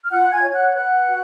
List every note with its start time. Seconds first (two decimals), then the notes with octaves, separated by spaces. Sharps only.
0.05 F6
0.10 F4 F#5 F#6
0.23 F#6
0.31 G#5 G#6
0.42 C#5
0.53 F#5 F#6
0.70 G#6
0.75 B4 F#5 F#6
1.08 F#4